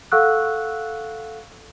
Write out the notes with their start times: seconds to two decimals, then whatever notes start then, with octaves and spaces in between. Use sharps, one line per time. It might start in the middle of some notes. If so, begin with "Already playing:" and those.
0.12 A4 F5 F#5 C#6 E6 F#6